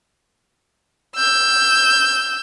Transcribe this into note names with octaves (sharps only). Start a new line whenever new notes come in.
E6 G6